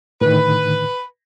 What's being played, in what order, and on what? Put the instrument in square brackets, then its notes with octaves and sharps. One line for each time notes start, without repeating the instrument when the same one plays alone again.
[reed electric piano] A2 D3 D#3 [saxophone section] B4